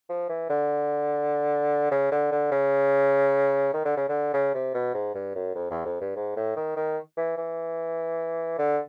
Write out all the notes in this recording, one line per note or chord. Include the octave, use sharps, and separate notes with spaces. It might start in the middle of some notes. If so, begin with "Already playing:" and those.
F3
E3
D3
C#3
D3
D3
C#3
D#3
D3
C#3
D3
C#3
C3
B2
G#2
G2
F#2
F2
E2
F2
G2
G#2
A2
D#3
D#3
E3
E3
D3